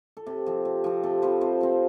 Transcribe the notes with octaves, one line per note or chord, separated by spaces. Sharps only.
A4
C3 G4
F3 C4
C3
F3 C4
C3 A4
F3 C4 B4
C3 C5
F3 C4